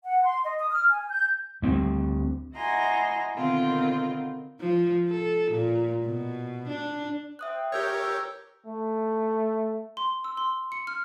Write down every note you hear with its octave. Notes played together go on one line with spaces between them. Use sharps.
F#5
C6
D#5
D#6
F6
G#5
G6
D2 G3 C4
E4 F#4 D#5 G#5 A#5 C6
B2 D3 D#3 C4 F4 A#4
F3
A4
A#2
B2
D4
C5 E5 G5 D#6 F#6
G4 A#4 C#5 E6 G6 G#6
A3
C6
E6
C6
C#7
F6